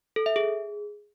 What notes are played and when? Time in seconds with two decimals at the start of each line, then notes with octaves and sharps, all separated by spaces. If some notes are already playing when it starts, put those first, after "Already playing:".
0.16 A4
0.26 E5
0.36 G#4